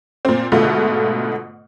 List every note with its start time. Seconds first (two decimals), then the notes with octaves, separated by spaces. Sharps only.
0.25 A#2 C4
0.52 G#2 B2 D3 A3 F4